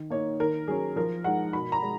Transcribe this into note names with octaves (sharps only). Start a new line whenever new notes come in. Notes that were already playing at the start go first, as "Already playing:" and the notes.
Already playing: D#3
A#3 D#4 C#5
D#3 A#4
F#3 C#4 G#4
F3 A#4
G#3 D#4 F#5
B2 B5
A#5
G#3